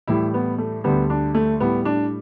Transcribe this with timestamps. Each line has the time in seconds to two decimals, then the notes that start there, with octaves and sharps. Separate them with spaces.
0.08 A2 E3 G3 E4
0.34 B3
0.58 A3
0.84 D2 D3 G3 B3
1.10 D4
1.35 A3
1.60 A2 G3 B3
1.85 D4